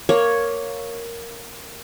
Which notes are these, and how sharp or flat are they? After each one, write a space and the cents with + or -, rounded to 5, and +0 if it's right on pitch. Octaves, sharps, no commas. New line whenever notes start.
A#3 +0 C#5 +0